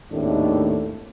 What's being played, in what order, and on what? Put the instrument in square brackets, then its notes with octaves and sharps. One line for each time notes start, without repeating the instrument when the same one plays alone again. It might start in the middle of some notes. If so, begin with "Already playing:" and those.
[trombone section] G#1 D#2 A2 A3 D4